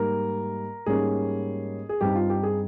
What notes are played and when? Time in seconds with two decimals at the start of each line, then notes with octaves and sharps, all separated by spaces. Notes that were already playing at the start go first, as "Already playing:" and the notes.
Already playing: G#2 G3 A#3 A#4
0.86 G#2 G3 A#3 C#4 G#4
1.89 G#4
2.01 G2 G3 C4 D#4 G4
2.15 F4
2.30 G4
2.43 G#4